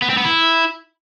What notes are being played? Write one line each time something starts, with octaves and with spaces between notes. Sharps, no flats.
B3
C4
B3
E4